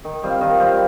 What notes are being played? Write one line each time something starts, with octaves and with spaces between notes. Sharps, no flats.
D#3
G3 C4 F4
D#3
G3 C4 F4